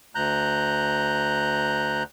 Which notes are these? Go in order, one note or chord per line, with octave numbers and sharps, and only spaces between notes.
D2 A#5 F#6 G6